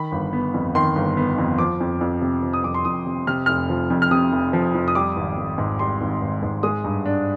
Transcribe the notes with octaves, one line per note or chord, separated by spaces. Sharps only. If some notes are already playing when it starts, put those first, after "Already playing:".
Already playing: D#3 B5
G1
B3
F2
D#3 C6
G1
B3
F2
F3 D6
F2
F2
C3
F3
D#6
F2 D6
C6
F2 D#6
C3
C3 F6
F1 F6
F3
F2
F6
C3 D#6
F1
F3
F2
D#6
G3 D6
G#1
G#1
G#2
G3 C6
G#1
G#1
G#2
G#3 D#6
G2
D4